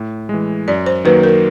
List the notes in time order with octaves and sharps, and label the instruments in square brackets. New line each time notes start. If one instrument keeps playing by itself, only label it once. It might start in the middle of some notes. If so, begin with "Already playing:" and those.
Already playing: [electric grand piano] A2
E3 G#3
[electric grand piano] F#2 [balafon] D5
[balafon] C5
[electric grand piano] D#3 F#3 A#3 [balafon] B4
[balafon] A#4